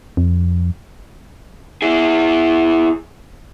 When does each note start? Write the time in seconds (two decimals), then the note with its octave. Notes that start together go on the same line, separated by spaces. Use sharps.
0.17 F2
1.82 E4 G#4